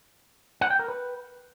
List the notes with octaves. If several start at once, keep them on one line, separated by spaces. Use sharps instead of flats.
F#5
G5
A#4
B4